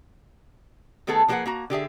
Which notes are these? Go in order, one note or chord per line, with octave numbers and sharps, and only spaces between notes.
D#3 A3 B3 G#4 A4
F3 A#3 F#4 G#4 B4 F#5
A#3 F#4 A#5
D3 G4 G#4 E5